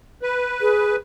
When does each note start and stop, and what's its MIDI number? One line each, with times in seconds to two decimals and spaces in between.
0.22 0.96 71
0.61 0.94 68